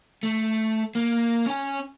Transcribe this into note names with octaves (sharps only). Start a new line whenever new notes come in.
A3
A#3
C#4 G#5